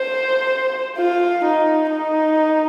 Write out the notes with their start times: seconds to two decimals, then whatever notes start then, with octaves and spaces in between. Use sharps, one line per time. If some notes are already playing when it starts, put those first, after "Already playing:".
Already playing: C5
0.98 F4
1.45 D#4
1.91 D#4